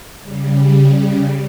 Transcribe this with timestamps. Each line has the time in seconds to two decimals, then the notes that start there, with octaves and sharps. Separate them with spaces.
0.21 C#3 G3